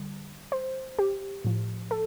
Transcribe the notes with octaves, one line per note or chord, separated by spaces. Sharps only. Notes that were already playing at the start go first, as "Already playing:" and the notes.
Already playing: D3 G3
C5
G4
A2 F3
A4